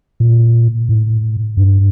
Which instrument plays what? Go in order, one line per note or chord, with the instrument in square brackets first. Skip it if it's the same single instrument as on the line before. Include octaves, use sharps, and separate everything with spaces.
[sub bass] A#2
A2
G2